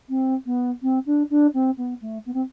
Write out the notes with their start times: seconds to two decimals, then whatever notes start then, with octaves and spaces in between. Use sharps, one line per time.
0.09 C4
0.46 B3
0.82 C4
1.06 D4
1.30 D4
1.54 C4
1.77 B3
2.01 A3
2.26 B3
2.33 C4